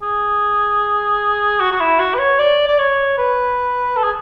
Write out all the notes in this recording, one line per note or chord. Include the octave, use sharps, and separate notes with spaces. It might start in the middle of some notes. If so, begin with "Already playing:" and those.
G#4
F#4
F#4
E4
F#4
B4
C#5
D5
D5
C#5
B4
A4
G#4